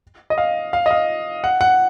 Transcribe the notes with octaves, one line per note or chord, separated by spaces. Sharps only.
D#5
F5
F5
D#5
F5
F#5
F#5